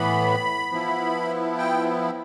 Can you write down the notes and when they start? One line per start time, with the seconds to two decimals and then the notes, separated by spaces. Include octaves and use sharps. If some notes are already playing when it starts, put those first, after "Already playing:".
Already playing: A2 E3 B3 B5
0.70 F3 B3 E4
1.58 G5